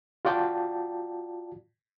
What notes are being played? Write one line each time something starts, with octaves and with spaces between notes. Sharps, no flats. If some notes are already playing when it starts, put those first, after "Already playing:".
F4 F#4 D5 G5 A5